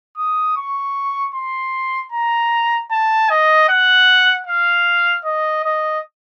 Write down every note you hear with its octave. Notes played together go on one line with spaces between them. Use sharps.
D#6
C#6
C6
A#5
A5
D#5
F#5
F5
D#5
D#5